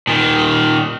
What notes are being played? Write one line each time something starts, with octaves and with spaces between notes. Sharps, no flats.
A#2 D#3